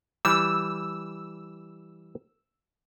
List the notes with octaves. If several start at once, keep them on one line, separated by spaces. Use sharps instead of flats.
E3 G3 E6